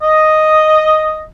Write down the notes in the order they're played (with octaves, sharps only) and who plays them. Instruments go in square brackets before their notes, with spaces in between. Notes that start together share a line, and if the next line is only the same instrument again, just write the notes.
[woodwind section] D#5